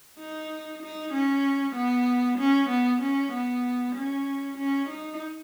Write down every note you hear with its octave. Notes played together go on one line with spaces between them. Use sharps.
D#4
D#4
C#4
B3
C#4
B3
C#4
B3
C#4
C#4
D#4